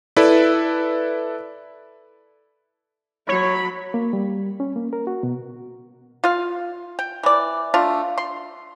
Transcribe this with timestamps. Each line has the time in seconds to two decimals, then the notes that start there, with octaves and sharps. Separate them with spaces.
0.17 E4 A4 B4 D5
3.29 F#3 C#5 B5
3.94 A#3
4.13 G3
4.60 C#4
4.76 A#3
4.93 A#4
5.07 F#4
5.23 B2
6.24 F4 F5
6.99 G5
7.23 E3 D5
7.74 A3 D4 F4
8.18 C6